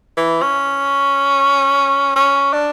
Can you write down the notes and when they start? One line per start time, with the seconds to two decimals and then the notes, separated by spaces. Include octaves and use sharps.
0.17 E3
0.42 C#4
2.16 C#4
2.53 D4